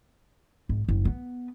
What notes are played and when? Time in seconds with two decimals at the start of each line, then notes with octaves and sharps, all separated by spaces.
0.69 G#1
0.88 F#1
1.05 B3